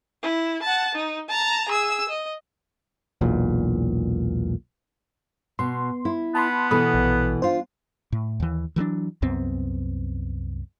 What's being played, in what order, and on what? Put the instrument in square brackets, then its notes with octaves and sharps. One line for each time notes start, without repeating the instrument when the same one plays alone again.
[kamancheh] E4
F#5 A5
D#4
A5 A#5
G#4 E6
D#5
[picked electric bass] E1 B1 E2 A#2
[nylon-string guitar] B2 [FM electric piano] C6
[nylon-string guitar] E4
[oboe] B3 [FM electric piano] A5 B5 C6
[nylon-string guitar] B2 E3 A4 [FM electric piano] B5 D#6
[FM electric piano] A#1
[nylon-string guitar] D4 F4 [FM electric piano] C5
[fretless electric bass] A2
D#2 E3
E3 F#3 G3 D4
C2 F#2 B3 C4